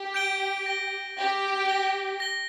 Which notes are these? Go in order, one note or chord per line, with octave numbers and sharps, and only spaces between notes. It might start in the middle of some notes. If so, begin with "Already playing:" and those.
Already playing: G4
G6 D7 G7
A#6 G7
G4 A#6 G7
A#6 G7
A#6 G7